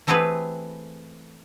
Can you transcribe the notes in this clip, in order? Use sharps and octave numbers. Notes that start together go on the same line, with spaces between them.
E3 A3 C4 G4 G#4 B4